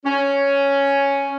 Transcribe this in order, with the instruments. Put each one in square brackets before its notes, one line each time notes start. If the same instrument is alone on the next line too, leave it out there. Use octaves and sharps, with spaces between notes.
[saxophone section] C#4